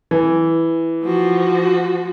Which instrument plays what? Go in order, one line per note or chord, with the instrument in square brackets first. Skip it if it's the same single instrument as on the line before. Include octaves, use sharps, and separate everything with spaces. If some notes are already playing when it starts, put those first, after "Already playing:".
[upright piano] E3
[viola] F3 F#4